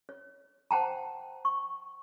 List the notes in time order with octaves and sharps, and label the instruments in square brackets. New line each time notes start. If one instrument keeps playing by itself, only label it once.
[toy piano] C#5
C5 F#5 G5 A5 A#5
C#6